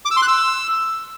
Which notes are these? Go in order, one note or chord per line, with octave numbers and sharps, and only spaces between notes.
D6
E6
C6
F#6
E6